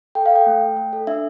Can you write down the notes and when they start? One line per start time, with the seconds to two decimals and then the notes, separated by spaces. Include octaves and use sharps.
0.15 A4 G5
0.26 F5
0.31 A4 G5
0.46 A3
0.61 A3
0.77 A3
0.93 A4
1.07 D4 E5